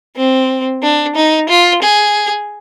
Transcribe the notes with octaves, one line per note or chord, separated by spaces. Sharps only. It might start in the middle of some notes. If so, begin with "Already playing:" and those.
C4
D4
D#4
F4
G#4